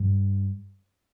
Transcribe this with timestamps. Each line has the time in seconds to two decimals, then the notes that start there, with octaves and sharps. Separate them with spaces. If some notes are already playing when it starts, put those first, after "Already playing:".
Already playing: G2